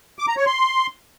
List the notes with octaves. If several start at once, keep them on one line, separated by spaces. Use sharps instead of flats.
D6
A#5
C#5
C6